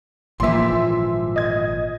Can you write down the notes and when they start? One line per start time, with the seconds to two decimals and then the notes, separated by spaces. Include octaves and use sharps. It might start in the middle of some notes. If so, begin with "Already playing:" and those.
0.40 G#1 A#2 E3 F3 A#3 E5 C6
1.36 D#5 G#6